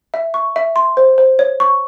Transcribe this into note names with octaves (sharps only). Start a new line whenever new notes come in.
E5
C#6
E5
C6
C5
C5
C#5
C#6